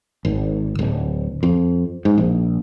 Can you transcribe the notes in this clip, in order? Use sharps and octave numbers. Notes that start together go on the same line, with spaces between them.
G#1
D1
F2
G#2
A#1